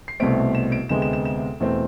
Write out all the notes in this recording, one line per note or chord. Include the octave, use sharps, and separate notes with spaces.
C7
C2 B2 A3 C4 D7
E7
D7
D2 C3 G#3 B3 E7
E7
E7
E7
E2 B2 A3 C4